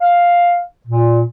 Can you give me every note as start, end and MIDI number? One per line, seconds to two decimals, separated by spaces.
0.01 0.59 77
0.87 1.22 46